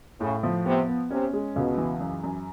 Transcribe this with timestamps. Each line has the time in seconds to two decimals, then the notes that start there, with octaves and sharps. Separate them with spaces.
0.20 A2 C#3
0.43 F3
0.66 C3 B3
0.89 B3
1.11 C3 C#4
1.33 G#3
1.56 C#2 B2
1.78 E3
2.00 F#2
2.24 F#2